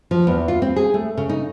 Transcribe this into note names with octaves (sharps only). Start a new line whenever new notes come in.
F3
E2
F4
C4
G#4
A3
C#3
D#4